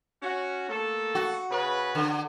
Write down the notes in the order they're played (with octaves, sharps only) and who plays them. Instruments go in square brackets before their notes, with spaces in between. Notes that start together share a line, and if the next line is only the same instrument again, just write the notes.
[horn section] C#4 F#4
A3 A#3 A4
[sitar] F#4
[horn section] C#3 B4
[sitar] D3